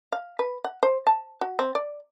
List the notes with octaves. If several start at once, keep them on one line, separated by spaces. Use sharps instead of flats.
F5
B4
F#5
C5
A5
F#4
C4
D5